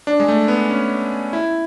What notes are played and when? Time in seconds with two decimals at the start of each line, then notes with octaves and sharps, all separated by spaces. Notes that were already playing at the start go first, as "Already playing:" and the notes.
0.07 D4
0.20 G#3
0.28 A3
0.48 B3
0.70 C#4
1.33 E4